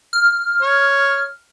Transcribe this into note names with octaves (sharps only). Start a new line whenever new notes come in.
F6
C#5